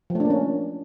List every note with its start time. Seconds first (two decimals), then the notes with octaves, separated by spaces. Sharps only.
0.10 F3
0.15 A3
0.20 D4
0.25 A#3
0.30 C#4